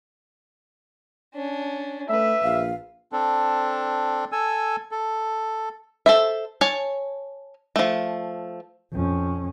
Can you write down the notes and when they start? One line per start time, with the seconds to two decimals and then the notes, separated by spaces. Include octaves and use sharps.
1.35 C#4 D4
2.09 A3 B4 E5
2.43 A#1 F5
3.12 C4 D4 A4
4.32 A4 G#5 E6
4.91 A4
6.06 A4 C5 E5
6.61 C#5 G#5 A5
7.76 F3 A3
8.93 F2 C#4